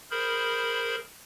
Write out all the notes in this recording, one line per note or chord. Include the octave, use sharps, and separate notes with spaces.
G#4 A#4 C5 B5